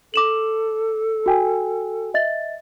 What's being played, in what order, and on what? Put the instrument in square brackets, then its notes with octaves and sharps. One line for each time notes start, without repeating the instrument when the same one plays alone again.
[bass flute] A4 [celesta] D6 E7 F#7
[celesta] F#4 G5 G#5
D#5 E5 A6